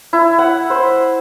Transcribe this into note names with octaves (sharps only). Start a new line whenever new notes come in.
E4
F#5
C5